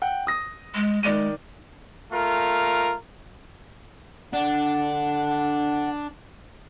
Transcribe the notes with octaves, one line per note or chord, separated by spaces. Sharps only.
F#5 G5
D#6 A#6
G#3
D#3 G#3 D5 D#7
A3 F4 A#4
D3 D4 F#5